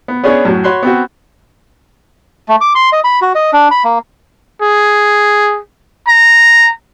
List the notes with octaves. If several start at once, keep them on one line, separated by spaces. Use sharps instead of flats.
B3
B3 C#4 D4 G#4 C#5
F#2 A2 F#3
F#4 C#5 B5 C6 F#6
B3 C4 F#4
A3
D6
C6
D#5
B5
F#4
D#5
D4
B5
A#3
G#4
A#5